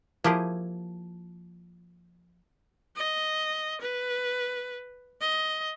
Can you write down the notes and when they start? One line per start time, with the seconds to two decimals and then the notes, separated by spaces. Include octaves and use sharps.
0.24 F3 A#3 E4 G4 G#4
2.96 D#5
3.81 B4
5.21 D#5